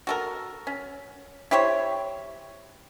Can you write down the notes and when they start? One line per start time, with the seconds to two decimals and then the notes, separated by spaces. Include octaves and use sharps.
0.07 F#4 A4 A#4
0.67 C#4
1.51 E4 G4 C5 C#5